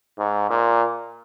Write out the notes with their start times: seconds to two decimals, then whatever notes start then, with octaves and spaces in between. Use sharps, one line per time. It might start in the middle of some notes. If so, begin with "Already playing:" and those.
0.19 G#2
0.50 A#2